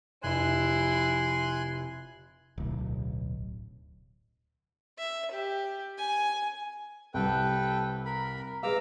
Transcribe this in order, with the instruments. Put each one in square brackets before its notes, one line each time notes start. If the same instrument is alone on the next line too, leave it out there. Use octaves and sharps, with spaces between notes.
[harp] F1 B5 [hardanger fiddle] E4 [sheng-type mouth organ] G#5 C6 F#6
[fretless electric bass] D1 B1
[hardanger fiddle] E5
G4
G#5
[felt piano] C2 G3 [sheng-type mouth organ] A4 B4 G5
[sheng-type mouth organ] A#4 B5
[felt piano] G#3 B4 F5 [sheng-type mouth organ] A#5 D6 E6